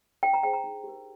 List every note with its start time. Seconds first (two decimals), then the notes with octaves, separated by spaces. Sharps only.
0.23 D4 G5
0.33 A#5
0.43 G#4 C5 G5
0.53 A#5
0.64 D#4
0.84 G4 A#4